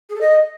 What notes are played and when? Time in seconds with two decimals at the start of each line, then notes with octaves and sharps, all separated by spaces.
0.09 G#4
0.15 A4
0.21 D#5